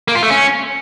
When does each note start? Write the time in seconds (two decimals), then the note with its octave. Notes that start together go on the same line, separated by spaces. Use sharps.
0.08 A#3
0.15 F4
0.23 A3
0.30 C#4